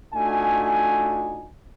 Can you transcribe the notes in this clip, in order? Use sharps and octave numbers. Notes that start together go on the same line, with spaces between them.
A3 D4 D#4 F4 F#4 G#5